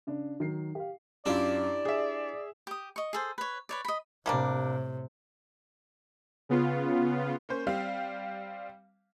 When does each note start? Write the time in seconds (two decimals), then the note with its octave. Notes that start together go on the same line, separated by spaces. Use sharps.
0.07 C#3 D4
0.40 D#3 F#3 C7
0.75 G4 F5
1.26 F#2 D4 E4 F4 G4 D5
1.85 G#4 E5
2.67 G4 D#6
2.96 D#5 C#6
3.13 G#4 A4 C5
3.38 B4 C#5
3.69 B4 C#5 D5
3.85 D#5 B5
4.26 A2 C3 G3 A#3 D4
6.49 C#3 B3 F4
7.49 A#3 C#4 C5
7.67 G3 C4 G4 F5